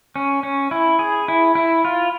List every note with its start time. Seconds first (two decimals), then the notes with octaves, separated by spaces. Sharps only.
0.16 C#4
0.43 C#4
0.71 E4
0.99 G#4
1.28 E4
1.55 E4
1.85 F4